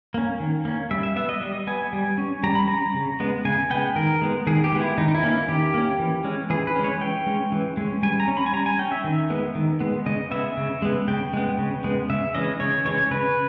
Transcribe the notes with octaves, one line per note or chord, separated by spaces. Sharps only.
A#3 C#4
D#3
A#3 C#4
G3 E5
E5
B3 E5
D#5
G3 D#5
B3 G#5
G3
C#4
G3 A#5
B5
C#4 A#5
C#3
G#3 B3
C#3 G#5
G#3 B3 G5
D#3 A#4
G#3 B3
D#3 G#4
G4
G#3 B3
E4
D#3 D#4
D#4
E4
A#3 C#4
E4
D#3 G4
A#3 C#4
E3
G#3 C#4
E3 G#4
B4
G#3 C#4
C#5
E3 G5
G#3 C#4
E3
G#3 C#4
G3 G#5
A#5
C#4
B5
G#5
G3 A#5
G#5
C#4 G5
E5
D#3
G#3 B3
D#3
G#3 B3
C#3 D#5
G#3 B3 E5
C#3
G#3 B3
C#3 G5
G#3 B3
C#3
G#3 B3
C#3 E5
E3 G#3 C#4 D#5
C#3 C#5
E3 G#3 C#4 C#5
C#3 B4